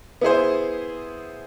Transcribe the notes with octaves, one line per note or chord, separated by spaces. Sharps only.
B3 E4 G#4 C5